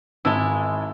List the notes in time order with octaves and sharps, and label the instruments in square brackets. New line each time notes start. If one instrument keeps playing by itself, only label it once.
[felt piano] G#1 A5 E6 [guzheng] G#3 E4